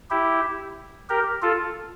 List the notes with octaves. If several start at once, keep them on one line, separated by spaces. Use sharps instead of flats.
E4 G4
G4 A#4
F4 A4